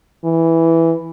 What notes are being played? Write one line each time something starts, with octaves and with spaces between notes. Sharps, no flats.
E3